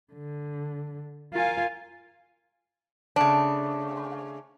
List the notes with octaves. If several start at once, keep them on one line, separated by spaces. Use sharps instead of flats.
D3
F4 A#4 F5 G#5
C#3 A3 D4